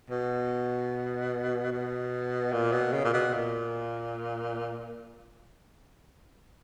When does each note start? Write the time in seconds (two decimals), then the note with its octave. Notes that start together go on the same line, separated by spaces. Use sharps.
0.10 B2
1.72 B2
2.53 A#2
2.72 B2
2.93 C#3
3.04 A#2
3.13 B2
3.33 A#2